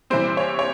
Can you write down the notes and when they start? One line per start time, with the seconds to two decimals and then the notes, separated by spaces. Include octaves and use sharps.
0.10 C3 E3 G3 C4 C5
0.37 C#5
0.59 C#5